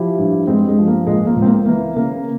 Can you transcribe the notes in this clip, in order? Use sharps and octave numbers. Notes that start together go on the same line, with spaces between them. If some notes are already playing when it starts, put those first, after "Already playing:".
Already playing: F3 E4 G4
G2
G2 G#3 C4
G#3
F3
A#3
C#2 G#3
A#3
C#2
C4
A#3
E3 A#3
C#3 A#3